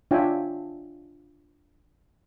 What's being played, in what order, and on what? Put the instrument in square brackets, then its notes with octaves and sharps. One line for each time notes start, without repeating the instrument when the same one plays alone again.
[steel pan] D4 F4 C#5 E5 G5 G#5